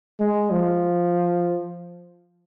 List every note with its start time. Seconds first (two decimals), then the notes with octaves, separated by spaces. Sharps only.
0.20 G#3
0.51 F3